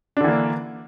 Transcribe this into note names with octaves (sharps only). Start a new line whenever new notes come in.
D3 E3 A#3 D4